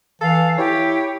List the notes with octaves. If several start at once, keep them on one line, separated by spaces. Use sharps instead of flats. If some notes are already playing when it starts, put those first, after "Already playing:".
E3 A4 F5
E4 G4 C#5